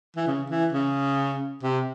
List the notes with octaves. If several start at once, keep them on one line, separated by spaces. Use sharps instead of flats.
E3
C#3
E3
C#3
C3